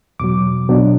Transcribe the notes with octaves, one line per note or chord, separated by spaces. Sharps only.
E2 B2 F#3 D6
B2 F#3 B3 D4